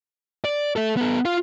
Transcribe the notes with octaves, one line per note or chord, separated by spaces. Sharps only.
D5
A4 E5
B3 A4
F4 F5